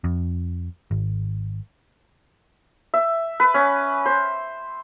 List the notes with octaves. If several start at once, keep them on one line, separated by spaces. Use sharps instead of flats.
F2
G#1
E5
B4
C#4
C5